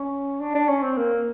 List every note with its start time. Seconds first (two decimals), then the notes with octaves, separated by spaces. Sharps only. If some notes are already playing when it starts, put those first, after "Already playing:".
Already playing: C#4
0.40 D4
0.55 D4
0.69 C#4
0.83 C4
0.97 A#3